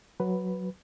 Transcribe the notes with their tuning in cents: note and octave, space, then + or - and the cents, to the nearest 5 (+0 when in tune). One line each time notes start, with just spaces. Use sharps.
F#3 +0 B4 +0